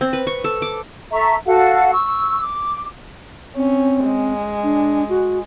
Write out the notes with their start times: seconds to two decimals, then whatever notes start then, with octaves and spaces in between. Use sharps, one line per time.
0.01 C4
0.13 B4
0.27 C#6
0.44 A4
0.62 D6
1.12 A4 E5 A#5 C#6
1.46 F#4 A4 F5 F#5
1.92 C#6 E6
2.39 D6
3.56 C4 C#4
4.04 G#3
4.64 D4
5.09 F#4